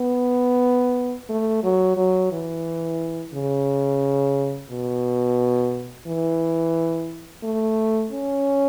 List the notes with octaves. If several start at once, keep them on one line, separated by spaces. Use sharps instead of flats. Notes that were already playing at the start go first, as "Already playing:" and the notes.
Already playing: B3
A3
F#3
F#3
E3
C#3
B2
E3
A3
C#4